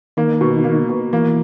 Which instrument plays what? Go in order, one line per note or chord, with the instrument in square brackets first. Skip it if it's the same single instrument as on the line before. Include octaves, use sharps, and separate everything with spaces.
[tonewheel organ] D#3 [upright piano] A#3
[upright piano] B2
A#3
B2
[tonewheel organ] E3 [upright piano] A#3